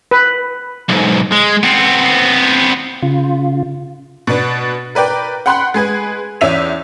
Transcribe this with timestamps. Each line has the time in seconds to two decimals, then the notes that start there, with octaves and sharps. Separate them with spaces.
0.11 B4
0.89 B1 G#2
1.32 G#3
1.63 B3 C4
3.02 C#3 F4
4.27 B2 D4 B4
4.95 A#4 B4 D5 G5
5.46 F#5 G5 B5 C6 F#6
5.74 G#3 G#4 B4 G#6
6.41 E2 C#4 E5 B6 D#7 F7